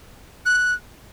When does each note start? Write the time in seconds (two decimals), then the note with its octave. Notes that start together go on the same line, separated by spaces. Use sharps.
0.46 F#6